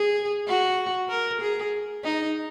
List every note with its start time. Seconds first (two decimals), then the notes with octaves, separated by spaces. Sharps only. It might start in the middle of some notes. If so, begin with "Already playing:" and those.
Already playing: G#4
0.48 F#4
1.09 A#4
1.41 G#4
2.04 D#4